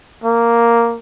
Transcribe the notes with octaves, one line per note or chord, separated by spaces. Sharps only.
A#3